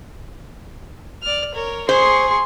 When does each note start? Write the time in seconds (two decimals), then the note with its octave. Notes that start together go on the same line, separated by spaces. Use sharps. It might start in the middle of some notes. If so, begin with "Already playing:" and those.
1.22 D5 F6
1.54 A#4 C#5
1.89 G#4 C5 C6 C#6